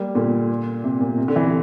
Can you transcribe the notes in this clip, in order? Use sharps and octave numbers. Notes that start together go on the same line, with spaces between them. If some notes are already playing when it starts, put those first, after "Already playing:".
Already playing: G3 A#3
A#2 D3
C3
A#2
C3
D3
C3 E3